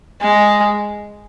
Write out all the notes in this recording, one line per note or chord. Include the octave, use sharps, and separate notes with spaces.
G#3